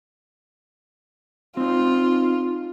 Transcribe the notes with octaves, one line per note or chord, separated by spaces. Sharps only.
C4 D#4 F4